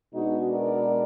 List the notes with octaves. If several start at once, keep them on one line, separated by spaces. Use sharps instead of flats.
B2 G#3 B3 D4 D#4 F#4
A#4 D5